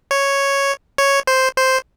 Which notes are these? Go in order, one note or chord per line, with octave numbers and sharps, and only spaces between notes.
C#5
C#5
C5
C5